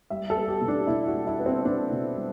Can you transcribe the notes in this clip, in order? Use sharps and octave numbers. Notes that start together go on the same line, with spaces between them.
G3 E5
A4
B3
G4
B2
D4
B2 E4
F#4
G3
E4
B3
C4
B2 D4
B2
G3